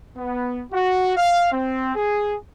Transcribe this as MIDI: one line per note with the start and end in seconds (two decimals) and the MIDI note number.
0.16 0.63 59
0.72 1.15 66
1.17 1.49 77
1.52 1.95 60
1.95 2.35 68